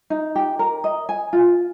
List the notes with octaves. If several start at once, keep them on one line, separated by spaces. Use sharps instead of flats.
D#4
G4
A#4
D#5
G#5
F4